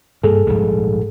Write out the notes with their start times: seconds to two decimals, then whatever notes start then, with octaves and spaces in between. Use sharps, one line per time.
0.24 G2 A#3 G#4 A4
0.47 A#1 G#2 G3